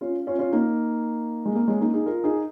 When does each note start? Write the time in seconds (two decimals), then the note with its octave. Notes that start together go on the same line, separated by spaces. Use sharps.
0.01 C#4 F4
0.27 C#4 F4
0.39 C#4 F4
0.52 A#3 D#4
1.46 G#3
1.55 A#3
1.68 G#3 C#4
1.80 A#3 D#4
1.93 D#4 G#4
2.06 F4 A#4
2.24 D#4 G#4